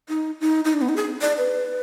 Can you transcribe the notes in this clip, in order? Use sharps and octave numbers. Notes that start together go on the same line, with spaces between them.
D#4
D#4
D#4
D4
B3
D#4
G#4
D5
B4